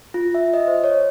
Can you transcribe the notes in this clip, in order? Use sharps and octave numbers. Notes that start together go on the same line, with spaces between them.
F4
E5
D#5
C5
C#5